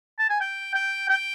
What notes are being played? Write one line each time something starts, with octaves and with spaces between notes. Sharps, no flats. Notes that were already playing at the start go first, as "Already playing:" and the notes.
A5
G#5
G5
G5
G5